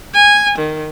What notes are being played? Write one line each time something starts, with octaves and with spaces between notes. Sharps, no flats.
G#5
D#3